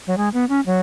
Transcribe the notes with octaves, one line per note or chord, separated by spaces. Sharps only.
F#3
G#3
B3
C#4
F#3